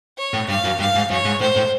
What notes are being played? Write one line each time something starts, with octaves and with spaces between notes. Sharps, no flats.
C#5
A2
G2 F5
F#2
G2 F5
G#2
F#2 C#5
G#2
A2 C5
A2